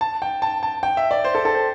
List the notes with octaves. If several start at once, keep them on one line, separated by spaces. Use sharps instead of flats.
A5
G5
A5
A5
G5
E5
D5
C5
A4
A4
C5